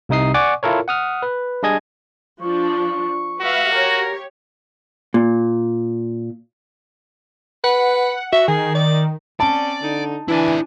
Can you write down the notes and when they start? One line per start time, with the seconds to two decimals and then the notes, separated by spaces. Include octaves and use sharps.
0.09 C2 C3 D#4 D#6 C7
0.34 D5 F#5 G#5 C#6 D6
0.63 E4 F4 A4 A#4 C#5
0.88 F#5 D#6 F6
1.23 B4
1.63 G3 D4 G#4 D#5 G#5 G#6
2.41 F3 D4 C#6
3.41 F#4 B4 E5 F5
3.71 G4 A#4 C#5
5.14 A#2
7.64 B4 F#5
8.32 F#4 E5
8.48 D#3 G#4
8.75 D5
9.40 C4 C#4 D5 A5
9.82 D3 D#4
10.28 E3 D4 E4 D5 G#5